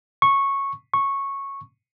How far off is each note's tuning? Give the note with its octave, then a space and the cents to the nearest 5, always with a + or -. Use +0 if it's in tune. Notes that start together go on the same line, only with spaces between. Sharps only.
C#6 -10
C#6 -10